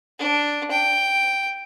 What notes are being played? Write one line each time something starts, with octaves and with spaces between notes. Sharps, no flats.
D4
G5